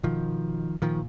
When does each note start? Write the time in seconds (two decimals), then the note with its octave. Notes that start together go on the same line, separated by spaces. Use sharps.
0.03 B2 D#3 F3
0.82 A#2 D#3 F3